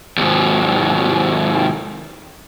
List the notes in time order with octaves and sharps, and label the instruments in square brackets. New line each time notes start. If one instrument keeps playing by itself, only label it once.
[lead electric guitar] D#2 G#2